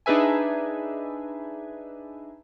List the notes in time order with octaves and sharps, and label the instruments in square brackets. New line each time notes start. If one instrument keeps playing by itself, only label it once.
[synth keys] D4 D#4 G#4 B4 E5 G#5